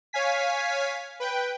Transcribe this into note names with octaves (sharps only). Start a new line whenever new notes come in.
C#5 F5 G#5 B6
B4 G5